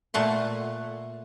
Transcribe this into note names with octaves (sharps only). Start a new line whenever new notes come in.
A#2 A3 F#5 C6